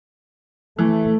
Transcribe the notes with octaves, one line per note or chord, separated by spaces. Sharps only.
E3 A3